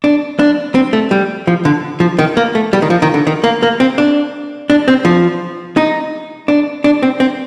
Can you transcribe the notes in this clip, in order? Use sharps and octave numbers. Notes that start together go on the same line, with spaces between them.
D4
D4
C4
A3
G3
F3
D3
F3
D#3
A#3
A3
G3
D#3
F3
D#3
D3
D#3
A#3
A#3
C4
D4
D4
C4
F3
D#4
D4
D4
C4
C4